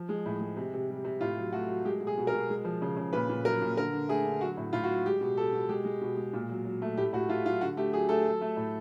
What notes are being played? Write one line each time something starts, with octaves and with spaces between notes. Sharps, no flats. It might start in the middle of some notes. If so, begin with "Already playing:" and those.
Already playing: F3
G#3
A2
G#3
C3
C3
G3
C3
A2 F4
F#3
A3 F#4
F#3
G#3 G4
B2
G#4
B2
A#4
B2
G#3
F3
C#3
C#3
A#2 B4
A#2
F#3 A#4
A#2
D3 A#4
D3
A3 G#4
D3
F#3 F#4
A2
A2 F4
F#4
F#3
G#3 G4
B2
B2 A4
B2
G#3 G4
G#3
B2
G#3
A#2
F#3
F#3
A3
A2 G4
A2 F#4
A3 F4
F#3 F4
D3 F#4
A3 G4
F#3 G#4
A3 A4
F#3
A3
A2